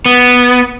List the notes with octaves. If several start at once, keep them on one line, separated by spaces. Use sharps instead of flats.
B3